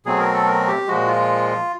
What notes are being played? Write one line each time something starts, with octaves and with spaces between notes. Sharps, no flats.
B2 F#3 A3 C4 G#4
A#4
A4
A#4
G4
A#2 F3 G#3 F#4
F4